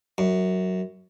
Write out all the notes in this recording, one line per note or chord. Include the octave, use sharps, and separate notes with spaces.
F#2